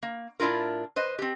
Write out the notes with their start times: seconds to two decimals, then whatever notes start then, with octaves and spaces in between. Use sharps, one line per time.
0.03 A#3
0.40 A2 D4 E4 F4 A#4
0.96 B4 C5 D#5
1.19 C4 G4